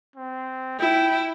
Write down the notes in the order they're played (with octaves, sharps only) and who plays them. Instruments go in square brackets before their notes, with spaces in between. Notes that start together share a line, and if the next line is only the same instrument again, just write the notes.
[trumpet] C4
[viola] E4 [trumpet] G5